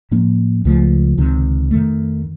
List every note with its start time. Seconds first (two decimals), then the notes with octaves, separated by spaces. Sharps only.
0.11 A2 F3 A#3 C#4
0.65 C#2 C#3 F3 A3
1.18 C#2 C3 D#3
1.71 F2 D#3 A3